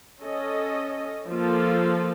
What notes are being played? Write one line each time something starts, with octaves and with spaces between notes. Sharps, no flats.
C#4 A4 D#5
F3 A#3 F4 A4